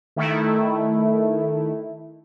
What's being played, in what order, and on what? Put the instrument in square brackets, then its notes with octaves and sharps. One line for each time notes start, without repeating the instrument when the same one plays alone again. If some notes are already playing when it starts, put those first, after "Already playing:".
[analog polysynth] D#3 A3 E4